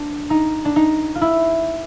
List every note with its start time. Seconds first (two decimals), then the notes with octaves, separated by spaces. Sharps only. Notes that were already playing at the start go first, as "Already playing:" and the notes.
Already playing: D4
0.30 D#4
0.65 D4
0.76 D#4
1.15 F4
1.21 E4